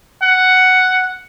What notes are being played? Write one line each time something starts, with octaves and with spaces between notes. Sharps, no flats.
F#5